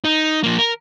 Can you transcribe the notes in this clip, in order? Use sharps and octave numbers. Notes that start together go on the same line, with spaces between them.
D#4
F3 A#3
A#4